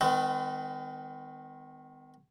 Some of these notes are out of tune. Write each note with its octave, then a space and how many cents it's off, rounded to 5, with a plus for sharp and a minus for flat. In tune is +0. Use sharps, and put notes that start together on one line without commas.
D#3 +0 G#3 -35 B3 +45